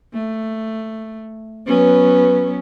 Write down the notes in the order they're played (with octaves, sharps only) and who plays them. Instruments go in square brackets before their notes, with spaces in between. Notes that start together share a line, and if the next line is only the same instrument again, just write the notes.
[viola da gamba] A3
[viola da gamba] F#3 B3 C#4 [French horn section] B4